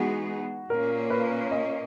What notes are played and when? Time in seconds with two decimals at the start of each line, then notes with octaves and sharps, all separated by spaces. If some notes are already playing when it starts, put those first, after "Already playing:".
Already playing: E3 G#3 B3 D#4 F#4 G#4
0.70 A#2 A#3 C#4 A#4
1.10 B4
1.51 D#5